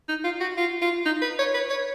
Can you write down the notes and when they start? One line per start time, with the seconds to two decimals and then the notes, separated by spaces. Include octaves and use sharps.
0.09 D#4
0.24 F4
0.41 F#4
0.57 F4
0.82 F4
1.06 D#4
1.22 B4
1.39 C#5
1.54 B4
1.70 C#5